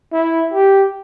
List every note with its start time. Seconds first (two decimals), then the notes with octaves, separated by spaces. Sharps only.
0.12 E4
0.53 G4